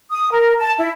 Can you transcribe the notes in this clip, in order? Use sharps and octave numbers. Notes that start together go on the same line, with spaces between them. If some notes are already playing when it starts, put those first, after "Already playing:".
D#6
A#4
A5
E4